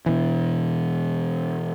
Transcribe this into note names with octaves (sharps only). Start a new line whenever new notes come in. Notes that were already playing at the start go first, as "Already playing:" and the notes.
B2 E3